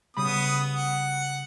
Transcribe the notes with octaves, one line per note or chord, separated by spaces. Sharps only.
C#3 G3 B3 B5 D#6
F#5